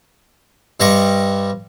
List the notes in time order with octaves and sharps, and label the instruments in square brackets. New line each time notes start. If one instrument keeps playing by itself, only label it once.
[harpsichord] G2 G3 C4 D#5 C#6